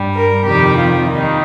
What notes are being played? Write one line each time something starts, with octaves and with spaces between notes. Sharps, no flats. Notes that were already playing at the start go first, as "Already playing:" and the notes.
Already playing: G2 G3
A#4
F2 C3 D#3 G3 G4
F4
D#2 D#3 G3 D#4